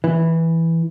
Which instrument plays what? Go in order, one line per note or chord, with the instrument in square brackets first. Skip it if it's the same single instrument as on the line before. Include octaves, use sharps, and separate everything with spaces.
[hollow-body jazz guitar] E3